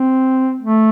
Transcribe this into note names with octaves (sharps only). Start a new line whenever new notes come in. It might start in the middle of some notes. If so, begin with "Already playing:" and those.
Already playing: C4
A3